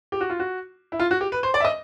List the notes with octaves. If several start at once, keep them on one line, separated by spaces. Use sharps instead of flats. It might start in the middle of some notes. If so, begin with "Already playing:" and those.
G4
F#4
F4
F#4
E4
F4
F#4
G4
B4
C5
D5
E5
D#5